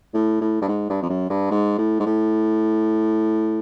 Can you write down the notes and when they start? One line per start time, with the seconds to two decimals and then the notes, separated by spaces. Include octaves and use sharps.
0.14 A2
0.41 A2
0.62 G2
0.68 G#2
0.90 G2
1.02 F2
1.09 F#2
1.30 G2
1.51 G#2
1.78 A2
2.00 G#2
2.06 A2